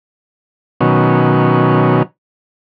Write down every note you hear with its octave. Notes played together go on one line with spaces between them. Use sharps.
B2 D#3 F#3 C#4